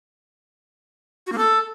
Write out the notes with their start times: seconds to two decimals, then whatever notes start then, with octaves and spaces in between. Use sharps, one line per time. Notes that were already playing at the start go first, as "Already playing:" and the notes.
1.27 F#4
1.32 A#3
1.38 A4